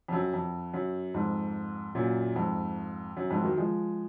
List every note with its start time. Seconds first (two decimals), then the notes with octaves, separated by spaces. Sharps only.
0.08 F2
0.12 F#2
0.33 F2
0.74 F#2
1.14 F2 G#2
1.95 F#2 A#2
2.35 F2 G#2
3.17 F#2
3.30 F2 G#2
3.44 D#3 F#3
3.58 F3 G#3